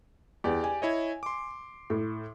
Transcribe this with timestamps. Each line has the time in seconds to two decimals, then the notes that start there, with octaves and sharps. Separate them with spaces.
0.44 E2 G4 D5
0.64 G#5
0.82 E4 C#5 D#5
1.23 C6 D6
1.90 A2